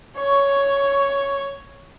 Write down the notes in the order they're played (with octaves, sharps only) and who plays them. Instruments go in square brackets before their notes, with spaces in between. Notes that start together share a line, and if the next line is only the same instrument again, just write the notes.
[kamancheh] C#5 C#6